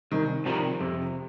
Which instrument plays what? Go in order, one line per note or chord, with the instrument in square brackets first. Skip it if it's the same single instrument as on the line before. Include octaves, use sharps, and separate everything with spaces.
[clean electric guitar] C2 [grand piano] D#3
[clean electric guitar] C3 D#3 G3 [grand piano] F3
[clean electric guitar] F2 [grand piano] C3